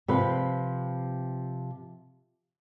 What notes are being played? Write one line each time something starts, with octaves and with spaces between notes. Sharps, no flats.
C3 F3 B4